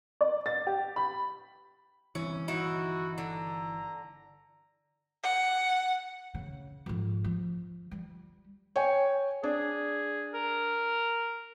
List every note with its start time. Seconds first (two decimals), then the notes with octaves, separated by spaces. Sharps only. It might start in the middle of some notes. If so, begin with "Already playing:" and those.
0.21 D5
0.46 A6
0.67 G4
0.96 B5
2.15 G1 C2 E3 C#4
2.48 G1 A#2 D#3 D#4 E4 F#4
3.18 D3 A#5
5.23 F#5
6.35 C#3
6.86 F2 G#2
7.24 F3
7.91 G3
8.76 C#5 G5 G#5
9.43 D4 G#4
10.34 A#4